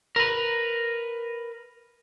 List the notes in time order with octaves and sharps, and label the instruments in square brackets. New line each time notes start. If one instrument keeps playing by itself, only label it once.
[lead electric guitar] A#4 B4